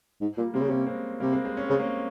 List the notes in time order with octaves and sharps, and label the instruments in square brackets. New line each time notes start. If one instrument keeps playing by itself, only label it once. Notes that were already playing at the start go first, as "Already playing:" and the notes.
[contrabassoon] G#2
[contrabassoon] A#2 [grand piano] G3 A#3
[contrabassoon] C3 [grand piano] G3 A#3
[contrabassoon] C#3
[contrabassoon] C3 [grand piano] A#3 C#4
[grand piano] G#3 C4
[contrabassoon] C3 [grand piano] G3 A#3
[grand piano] G#3 C4
G#3 C4
C#4
[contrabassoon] C#3 [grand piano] C4
[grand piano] A#3 C#4